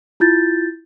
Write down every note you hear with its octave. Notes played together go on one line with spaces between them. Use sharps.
E4 F4 G6 A6